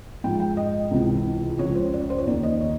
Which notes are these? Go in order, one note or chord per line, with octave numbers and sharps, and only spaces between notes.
G#2 F3 G5
G5
D#5
C#2 C3 E3
C#2 C#3 F3 C#5
C5
D5
C#5
C5
C#5
D#2 D#3 D5
D#5
C#5